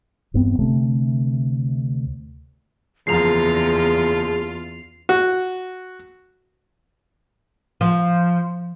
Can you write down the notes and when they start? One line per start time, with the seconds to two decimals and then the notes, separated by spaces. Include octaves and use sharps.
0.34 E1 G2 B3 C4
0.59 D2 C3 A3
3.07 F#1 E2 F3 F4 G#4 A#5 C7 F7
5.09 F#4
7.81 F3